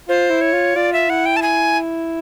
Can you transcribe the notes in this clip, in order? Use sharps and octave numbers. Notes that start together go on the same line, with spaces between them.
F4 C5
E4
C#5
F4
F4 D5
E5
E4 F#5
G5
A5
G#5